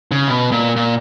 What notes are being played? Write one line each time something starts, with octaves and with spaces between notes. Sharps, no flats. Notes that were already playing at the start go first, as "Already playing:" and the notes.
C#3
B2
A#2
A#2